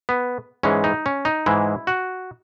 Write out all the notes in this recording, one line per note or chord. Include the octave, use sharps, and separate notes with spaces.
B3
G#2 E3 G#3 C#4
D#4
C#4
D#4
G#2 E3 G#3 E4
F#4